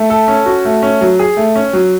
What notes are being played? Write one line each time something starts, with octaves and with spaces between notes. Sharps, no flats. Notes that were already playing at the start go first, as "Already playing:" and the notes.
Already playing: A3
A4
C#4
F#4
A3
C#4
F#3
G#4
A3
C#4
F#3